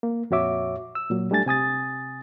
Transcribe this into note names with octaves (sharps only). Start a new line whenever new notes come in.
A#3
F2 A#2 F#4 C#5 E5 D6
E6
A#2 F#3
G3 A3 D4 G#5 A6
C3 G#5 D#6 A6